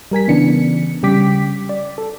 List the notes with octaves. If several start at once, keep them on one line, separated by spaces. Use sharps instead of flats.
G3 A#4 G#5 B6
C#3 E3 B3 D4 C#7
C#3 G3 G5 D6 B6
D5
A4